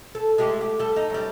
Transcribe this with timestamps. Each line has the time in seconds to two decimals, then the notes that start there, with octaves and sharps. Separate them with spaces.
0.15 A4
0.38 G#3 A3 G4
0.61 G4
0.79 G3 A4
0.96 D#4
1.10 F#2 G3